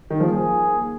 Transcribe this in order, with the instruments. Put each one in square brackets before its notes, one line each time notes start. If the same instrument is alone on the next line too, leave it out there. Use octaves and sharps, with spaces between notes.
[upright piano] D#3
[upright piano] F3 [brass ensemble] A#3 G#4